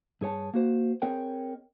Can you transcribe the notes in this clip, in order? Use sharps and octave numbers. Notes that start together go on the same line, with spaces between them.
G2 G#4 C#5 A5
A#3 F#4 C5
C4 G#4 A#4 C#5 D#5 G5